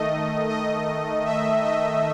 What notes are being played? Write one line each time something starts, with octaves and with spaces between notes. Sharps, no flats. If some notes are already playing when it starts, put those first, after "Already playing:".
Already playing: D#3 A3 D#5
D#5
E5
D#5